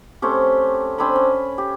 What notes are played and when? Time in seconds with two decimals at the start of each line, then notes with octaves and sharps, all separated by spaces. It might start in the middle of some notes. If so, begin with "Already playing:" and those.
0.22 A3 C4 C#4 G4
0.98 C4 D4 G#5 B5
1.16 C#4
1.58 G4